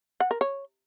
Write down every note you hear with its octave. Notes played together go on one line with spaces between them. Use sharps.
F#5
A#4
C#5